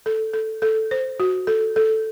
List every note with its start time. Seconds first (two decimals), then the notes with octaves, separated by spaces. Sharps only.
0.06 A4
0.34 A4
0.62 A4
0.91 C5
1.20 F#4
1.47 A4
1.76 A4